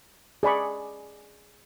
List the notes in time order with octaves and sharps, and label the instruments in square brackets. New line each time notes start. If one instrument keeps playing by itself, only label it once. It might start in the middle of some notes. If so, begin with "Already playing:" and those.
[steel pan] G#4 D5 B5 C#6